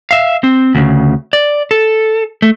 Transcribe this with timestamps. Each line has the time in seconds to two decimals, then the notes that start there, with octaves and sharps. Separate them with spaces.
0.11 E5 F5
0.44 C4
0.75 D2 C#3
1.33 D5
1.71 A4
2.42 A3